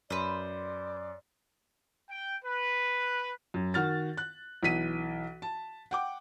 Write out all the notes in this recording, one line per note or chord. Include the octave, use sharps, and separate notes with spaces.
F#2 B4 C5 D5
G5
B4
F#2
D#3 F#4 F6 A6
F#6
B1 E3 B6 D#7
A5
F#5 G5 D6